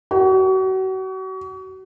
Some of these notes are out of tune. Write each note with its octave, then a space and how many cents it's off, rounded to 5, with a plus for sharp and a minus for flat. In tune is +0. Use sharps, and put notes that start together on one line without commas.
F#4 +35